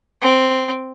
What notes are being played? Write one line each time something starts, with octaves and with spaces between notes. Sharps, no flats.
C4